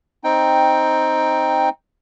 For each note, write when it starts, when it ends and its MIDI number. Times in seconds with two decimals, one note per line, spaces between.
0.24 1.69 60
0.24 1.69 63
0.24 1.69 79